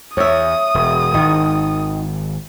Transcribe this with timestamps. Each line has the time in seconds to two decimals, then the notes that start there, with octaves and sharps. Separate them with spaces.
0.17 E2 C#5 E5 D#6
0.74 E1
1.14 G#1 D#3